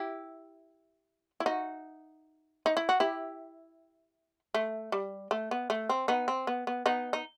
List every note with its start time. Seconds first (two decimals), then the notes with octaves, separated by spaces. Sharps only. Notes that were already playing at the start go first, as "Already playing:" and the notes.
Already playing: E4 G4
1.40 E4
1.46 D#4 F#4
2.66 D#4
2.77 E4
2.89 F#4
3.00 E4 G4
4.54 A3
4.92 G3
5.31 A3
5.51 B3
5.70 A3
5.89 C4
6.08 B3 D#4
6.28 C4
6.47 B3
6.67 B3
6.86 B3 D#4
7.13 D#4